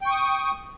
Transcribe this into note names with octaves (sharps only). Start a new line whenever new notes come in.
G5 C#6 D#6